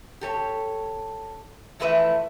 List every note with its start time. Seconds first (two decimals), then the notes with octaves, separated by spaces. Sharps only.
0.21 G4 A4 C#5
1.80 E3 F3 A3 E4 B4 E5